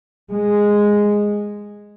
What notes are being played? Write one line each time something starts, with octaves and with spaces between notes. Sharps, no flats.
G#3